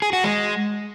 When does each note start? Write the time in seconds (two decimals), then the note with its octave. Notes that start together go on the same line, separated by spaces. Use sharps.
0.02 G#4
0.13 F#4
0.24 G#3